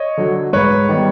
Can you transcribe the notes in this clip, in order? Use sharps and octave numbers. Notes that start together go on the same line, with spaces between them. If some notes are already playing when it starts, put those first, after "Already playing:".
Already playing: C#5 D#5
D3 F#3
G#2 B4 C#5
D#3 G3 B3